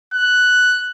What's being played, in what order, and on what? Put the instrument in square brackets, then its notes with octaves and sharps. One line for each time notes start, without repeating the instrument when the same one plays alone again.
[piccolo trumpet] F#6